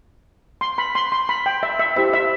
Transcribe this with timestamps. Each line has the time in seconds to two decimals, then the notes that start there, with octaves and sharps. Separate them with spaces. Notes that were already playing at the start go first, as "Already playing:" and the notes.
0.61 C6
0.78 B5
0.95 C6
1.12 C6
1.29 B5
1.46 G5
1.63 E5
1.79 E5
1.96 E4 G4 C5 E5
2.13 E5